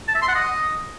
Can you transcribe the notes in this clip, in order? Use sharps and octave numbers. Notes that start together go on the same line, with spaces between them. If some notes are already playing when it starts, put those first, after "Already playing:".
A5
E5
C6
F#5
D#5